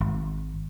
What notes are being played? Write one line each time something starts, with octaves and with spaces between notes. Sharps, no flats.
G#1